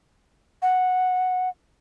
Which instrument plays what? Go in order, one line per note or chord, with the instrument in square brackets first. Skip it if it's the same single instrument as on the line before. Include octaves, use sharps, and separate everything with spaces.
[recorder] F#5